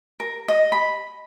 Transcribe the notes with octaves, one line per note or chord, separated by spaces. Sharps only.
A#4
D#5
B5